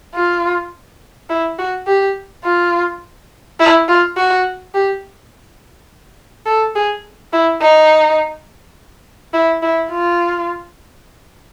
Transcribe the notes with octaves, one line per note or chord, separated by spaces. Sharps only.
F4
E4
F#4
G4
F4
E4
F4
F#4
G4
A4
G#4
E4
D#4
E4
E4
F4